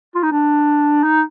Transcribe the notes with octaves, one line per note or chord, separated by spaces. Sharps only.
F4
D#4
D4
D#4